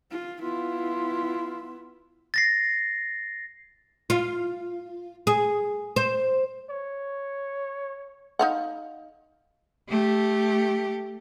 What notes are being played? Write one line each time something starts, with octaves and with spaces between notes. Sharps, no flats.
F4
B3 E4 F4
A6 A#6 C7
F4
G#4
C5
C#5
D#4 F5 F#5
A3 G4